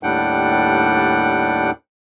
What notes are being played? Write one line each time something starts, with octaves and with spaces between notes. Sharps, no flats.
D#2 A2 G3 D4 F#5 G5